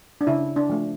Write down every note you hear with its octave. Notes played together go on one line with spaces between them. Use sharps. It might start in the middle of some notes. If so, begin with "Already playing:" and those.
D4
C#3 E4
D4
F3 A3